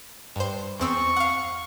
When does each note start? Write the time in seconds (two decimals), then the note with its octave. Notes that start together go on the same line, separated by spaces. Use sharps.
0.36 G2 C5
0.80 E2 C4 C#6 E6
1.16 F5 F#5